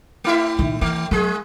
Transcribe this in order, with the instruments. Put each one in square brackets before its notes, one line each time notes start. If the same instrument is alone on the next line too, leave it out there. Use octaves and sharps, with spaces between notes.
[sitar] A3 E4 E5
[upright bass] A#2 D#3
[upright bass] E3 [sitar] A3
[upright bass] F#3 [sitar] G#3 G#4